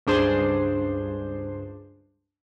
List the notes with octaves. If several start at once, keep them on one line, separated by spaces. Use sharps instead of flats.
C#2 G2 D4 G#4 C5 C6